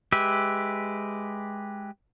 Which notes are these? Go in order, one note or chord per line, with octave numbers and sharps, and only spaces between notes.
G#3 G4 B4 E5